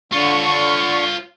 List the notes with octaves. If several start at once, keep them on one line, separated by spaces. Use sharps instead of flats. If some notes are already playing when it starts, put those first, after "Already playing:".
D3 F4 C#5 C#6